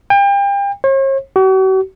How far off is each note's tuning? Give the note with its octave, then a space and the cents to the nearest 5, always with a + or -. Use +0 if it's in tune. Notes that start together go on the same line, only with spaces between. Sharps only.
G5 +35
C#5 -45
F#4 +45